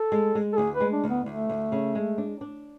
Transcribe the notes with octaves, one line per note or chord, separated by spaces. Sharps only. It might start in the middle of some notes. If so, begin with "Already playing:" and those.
Already playing: A4
G#3
G#3
A4
D2 G#4
B4
G#3
D4
D2
B3
D2 A3
D2
C#3
G#3
D4
D4